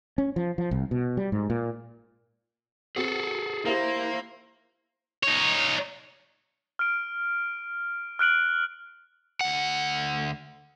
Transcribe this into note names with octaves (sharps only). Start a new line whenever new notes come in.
C#4
F3
F3
C2
B2
G3
G#2
A#2
C4 F#4 G#4 A4
A#3 E4 G4 A#4 C5 E5
D#4 C#5
F6 D7
F6 F#6 D7 F#7
D2 F#5